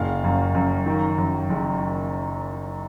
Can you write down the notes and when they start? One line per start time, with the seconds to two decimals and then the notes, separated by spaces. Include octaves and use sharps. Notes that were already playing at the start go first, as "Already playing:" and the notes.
Already playing: F#1 A#2 F5
0.24 F#2
0.55 F#2
0.86 D#3
1.18 F#2
1.50 F#1